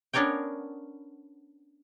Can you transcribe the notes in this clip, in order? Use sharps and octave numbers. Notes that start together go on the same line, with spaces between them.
B3 C#4 D4 A#4 C#5 G5